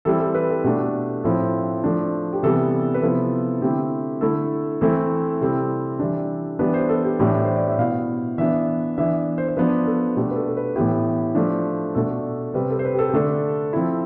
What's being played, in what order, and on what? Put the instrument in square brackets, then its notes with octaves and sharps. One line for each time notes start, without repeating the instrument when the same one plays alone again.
[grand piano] E3 G3 C4 E4 A4
A4
B4
A4
B2 A3 D4 G4
A2 F3 C4 E4 A4
F3 A3 D4
G4
C3 E3 G3 B3 A4
B4
C3 F3 B3 E4 A4
D3 A3 C4 E4 G4
D3 A3 E4 A4
E3 A3 C4 E4 A4
C3 G3 C4 E4 A4
E3 G3 D4
E3 G3 B3 D4 B4
C5
A4
G4
A2 E3 G3 D4 G4
C5
D5
E5
B2 B3 E4 F5
E3 B3 D4 E5
E3 B3 D4 E5
C5
C5
F3 B3 D4 B4
A4
B2 A3 D4 G4
B4
A4
A4
B4
A2 E3 B3 E4 G4
F3 A3 D4
B2 A3 D4 A4
C3 G3 C4 B4
A4
C5
B4
G4
A4
G4
D3 A3 D4 A4
F3 C4 E4